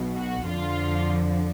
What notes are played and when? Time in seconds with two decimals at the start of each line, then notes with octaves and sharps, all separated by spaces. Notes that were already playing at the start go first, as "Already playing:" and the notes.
Already playing: B1 B2
0.17 F#4
0.47 F2 D3 F3 F4